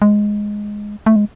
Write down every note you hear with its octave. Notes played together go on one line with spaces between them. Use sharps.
G#3
A3
G#3